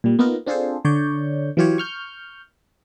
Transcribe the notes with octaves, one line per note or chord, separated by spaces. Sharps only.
A#2 G3
A#3 B3 D#4 F4 A#4
C4 D4 F4 G#4 A4 C5
D3 C#5 D5 C#6 G6
E3 F#3 F4 G4 C#5
C#6 F6 G6